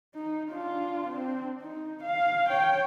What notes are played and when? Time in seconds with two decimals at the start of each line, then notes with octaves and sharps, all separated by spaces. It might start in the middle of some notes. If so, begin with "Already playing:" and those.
0.15 D#4
0.51 D4 F4
1.07 C4 D4
1.61 D#4
2.03 F5
2.49 C#5 G5